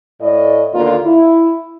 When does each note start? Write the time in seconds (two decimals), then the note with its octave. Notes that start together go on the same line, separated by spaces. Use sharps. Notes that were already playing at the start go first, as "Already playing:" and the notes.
0.21 A2 D5 D#5
0.74 D#2 B2 D3 A#3 F4
1.06 E4